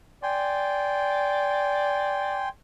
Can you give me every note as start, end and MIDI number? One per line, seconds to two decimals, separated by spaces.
0.23 2.47 74
0.23 2.49 79
0.23 2.49 80
0.23 2.49 84